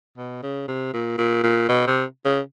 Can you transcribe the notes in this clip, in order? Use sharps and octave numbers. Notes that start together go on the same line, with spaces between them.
B2
C#3
C3
A#2
A#2
A#2
B2
C3
C#3